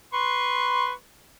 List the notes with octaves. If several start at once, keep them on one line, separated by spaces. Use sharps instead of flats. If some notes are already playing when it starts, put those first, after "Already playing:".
B4 C6 C#6